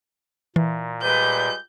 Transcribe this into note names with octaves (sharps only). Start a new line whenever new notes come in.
A#2 E3
G3 G#3 B4 G6